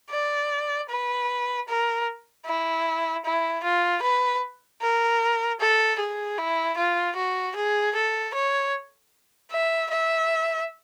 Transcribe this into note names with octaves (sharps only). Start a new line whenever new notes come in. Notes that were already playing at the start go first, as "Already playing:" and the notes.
D5
B4
A#4
E4
E4
F4
B4
A#4
A4
G#4
E4
F4
F#4
G#4
A4
C#5
E5
E5